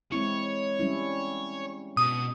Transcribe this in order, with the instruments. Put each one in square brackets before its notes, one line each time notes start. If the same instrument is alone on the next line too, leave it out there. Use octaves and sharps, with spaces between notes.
[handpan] G#3 C4 E4 [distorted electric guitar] C#5
[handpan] G3 C#4 E4
[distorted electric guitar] B2 [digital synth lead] D#6